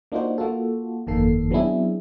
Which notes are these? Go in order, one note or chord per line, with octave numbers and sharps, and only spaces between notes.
A#3 D4 D#4 F4 F#4 C5
A#3 F4 F#4 A4
G1 F2 D#3 A#3 A4 C7
F#3 B3 C4 D4 E4 G#4